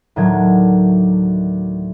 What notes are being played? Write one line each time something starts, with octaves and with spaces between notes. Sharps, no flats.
D2 A2 D#3 F#3 D4 G#6